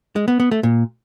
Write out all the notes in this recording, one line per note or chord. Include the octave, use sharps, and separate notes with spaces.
G#3
B3
B3
A3
A#2